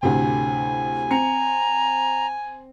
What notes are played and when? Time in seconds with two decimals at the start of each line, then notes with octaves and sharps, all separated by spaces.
0.03 D2 A2 C3 G#5
1.11 C4 A#5 C#7